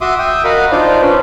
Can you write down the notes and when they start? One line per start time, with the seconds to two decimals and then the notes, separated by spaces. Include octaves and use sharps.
0.01 F#4 E5 C6 D6 D#6
0.19 E5 G5 D#6
0.45 F#4 A#4 D#5 F5 F#5 B5
0.72 D4 D#4 F4 C5 D5
1.02 C#4 D4 B4 C5